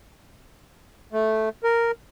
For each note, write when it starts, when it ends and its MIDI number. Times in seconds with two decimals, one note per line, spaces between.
1.13 1.49 57
1.64 1.91 70